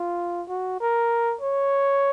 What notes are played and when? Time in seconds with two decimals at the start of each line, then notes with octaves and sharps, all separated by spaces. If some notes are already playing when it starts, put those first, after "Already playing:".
Already playing: F4
0.49 F#4
0.81 A#4
1.41 C#5